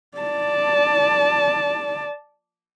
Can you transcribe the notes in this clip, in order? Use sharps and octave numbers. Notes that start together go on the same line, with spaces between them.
D5 A5